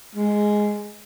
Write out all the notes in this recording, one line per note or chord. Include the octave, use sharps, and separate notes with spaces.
G#3